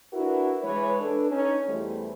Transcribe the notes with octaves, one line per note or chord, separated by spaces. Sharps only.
D4 E4 F#4 A#4 B4
E3 G#3 B4 C#5
D4 A4 B4
C#4 D#4
E2 E3 G3 A3 G4 C5